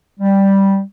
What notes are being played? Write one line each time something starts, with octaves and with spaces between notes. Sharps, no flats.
G3